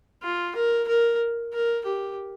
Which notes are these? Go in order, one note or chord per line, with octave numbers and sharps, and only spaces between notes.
F4
A#4
A#4
A#4
G4